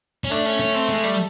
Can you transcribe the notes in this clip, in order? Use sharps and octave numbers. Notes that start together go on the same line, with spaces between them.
C#4
A3 D4
C#4
C#4
C4
G#3
G3